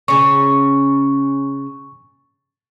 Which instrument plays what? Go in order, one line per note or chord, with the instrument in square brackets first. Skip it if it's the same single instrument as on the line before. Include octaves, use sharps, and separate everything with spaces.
[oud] C#3 C#4 [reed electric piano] C#6